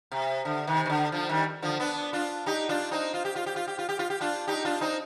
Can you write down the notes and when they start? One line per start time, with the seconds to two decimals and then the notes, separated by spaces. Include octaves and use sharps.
0.12 C3
0.45 D3
0.67 C3 D#3
0.86 D#3
0.90 D3
1.12 D3 F3
1.29 D#3 G3
1.62 D3 F3
1.80 B3 D4
2.13 D4 F4
2.46 D#4 G4
2.69 D4 F4
2.91 C4 D#4
3.14 F4
3.25 G4
3.36 F4
3.46 G4
3.56 F4
3.68 G4
3.79 F4
3.89 G4
3.99 F4
4.10 G4
4.21 D4 F4
4.47 D#4 G4
4.65 D4 F4
4.81 C4 D#4